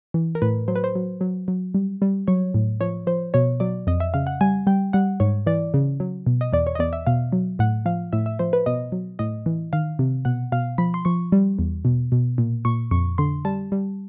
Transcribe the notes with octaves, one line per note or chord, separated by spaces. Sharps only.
E3
A#4
A2 B4
F#3 C5
B4
C5
F#3
F#3
F#3
G3
G3
F#3 C#5
A2
F3 C#5
F3 C5
B2 C#5
F#3 D5
F2 D#5
E5
C#3 F5
F#5
G3 G#5
G3 G5
G3 F#5
G#2 C#5
E3 D5
C#3
F#3
B2
D#5
E2 D5
C#5
D#5
E2 D5
E5
B2 F5
F#3
A2 F#5
F3 F5
A2 E5
E5
F3 C5
B4
B2 D#5
F#3
A2 D#5
E3
D#3 F5
C3
B2 F#5
B2 F5
F3 B5
C6
F3 C#6
G3
E2
B2
B2
A#2
A#2 C#6
F2 C#6
D3 C6
G3 A5
G3